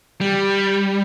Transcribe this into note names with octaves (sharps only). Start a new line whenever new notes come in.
G3